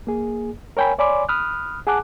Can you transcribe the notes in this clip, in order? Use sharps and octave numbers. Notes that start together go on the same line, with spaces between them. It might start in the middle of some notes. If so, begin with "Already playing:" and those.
A#3 G#4
A#4 C#5 G5 G#5 B5
C#5 D5 G#5 B5 C6 D6
B5 D#6 F6 F#6
G#4 F#5 G#5 A5 D6 F#6